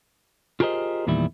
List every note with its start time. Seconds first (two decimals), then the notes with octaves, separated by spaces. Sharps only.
0.60 F4 G4 G#4 A#4 C5 D#5
1.07 E2 A#2 D#3 G3 E4